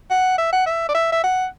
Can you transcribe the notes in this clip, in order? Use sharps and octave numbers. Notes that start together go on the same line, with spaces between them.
F#5
E5
F#5
E5
D5
E5
E5
F#5